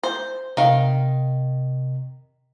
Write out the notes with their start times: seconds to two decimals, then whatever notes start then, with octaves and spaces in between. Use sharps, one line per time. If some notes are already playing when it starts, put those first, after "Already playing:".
0.03 C5
0.57 C3 D#3 F5